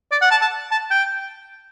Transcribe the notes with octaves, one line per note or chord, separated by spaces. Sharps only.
D5
F#5
A5
A5
A5
G5